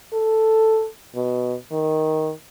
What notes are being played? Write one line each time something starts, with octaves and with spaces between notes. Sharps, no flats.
A4
B2
D#3